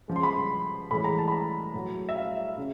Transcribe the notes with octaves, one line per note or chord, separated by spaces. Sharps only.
C#3 F3 G#3
C6
B5
C6
A2 E3 G#3 B5
A#5
A5
B5
A#5
A2 F#3
E5
F5
E5
C#3